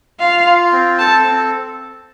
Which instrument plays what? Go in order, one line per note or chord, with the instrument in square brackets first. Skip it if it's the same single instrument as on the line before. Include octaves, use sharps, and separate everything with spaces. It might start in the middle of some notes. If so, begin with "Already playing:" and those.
[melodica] F4 [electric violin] F5
[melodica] F4
C4
[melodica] A4 [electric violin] A5
[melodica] C4